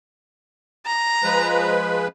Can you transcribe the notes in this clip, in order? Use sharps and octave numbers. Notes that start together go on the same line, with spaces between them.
A#5
F3 G#3 B4